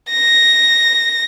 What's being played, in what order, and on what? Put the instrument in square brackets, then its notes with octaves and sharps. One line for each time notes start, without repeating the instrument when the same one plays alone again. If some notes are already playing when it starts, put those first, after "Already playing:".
[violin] A#6